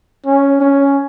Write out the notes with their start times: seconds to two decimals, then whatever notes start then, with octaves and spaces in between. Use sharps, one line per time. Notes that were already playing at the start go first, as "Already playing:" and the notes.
0.26 C#4
0.60 C#4